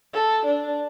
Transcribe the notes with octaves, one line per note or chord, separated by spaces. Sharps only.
A4
D4